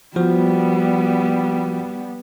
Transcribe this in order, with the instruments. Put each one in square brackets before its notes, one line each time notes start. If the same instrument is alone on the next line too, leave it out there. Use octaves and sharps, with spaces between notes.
[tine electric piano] F3 F#4 [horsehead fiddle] G3 B3